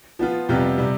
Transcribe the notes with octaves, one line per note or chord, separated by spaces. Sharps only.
F3 B3 F4
F2 C3 G3 B3 F4
C3 G3